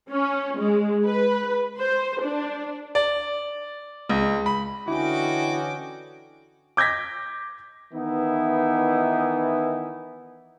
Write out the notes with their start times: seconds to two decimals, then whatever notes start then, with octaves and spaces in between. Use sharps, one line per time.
0.11 C#4
0.59 G#3
1.05 B4
1.79 C5
2.23 D4
2.95 D5
4.09 C#2
4.46 B5
4.88 D3 E3 C#4 E4 F#4 D#5 G5 D6
6.77 D6 G6 G#6 A#6 B6
7.94 D#3 E3 B3 D#4 E4